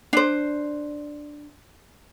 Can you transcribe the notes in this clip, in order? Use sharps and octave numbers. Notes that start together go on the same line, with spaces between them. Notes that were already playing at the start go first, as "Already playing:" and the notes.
D4 C5